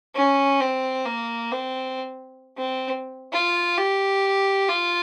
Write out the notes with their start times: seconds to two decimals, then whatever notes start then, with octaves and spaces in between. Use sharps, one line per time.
0.15 C#4
0.61 C4
1.06 A#3
1.52 C4
2.57 C4
3.33 F4
3.78 G4
4.69 F4